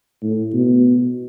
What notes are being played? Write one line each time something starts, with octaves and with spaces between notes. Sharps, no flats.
A2
B2